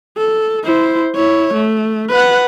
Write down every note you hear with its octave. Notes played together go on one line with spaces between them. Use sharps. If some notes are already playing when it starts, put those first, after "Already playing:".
A4
E4 C5
E4 C#5
A3
B4 F#5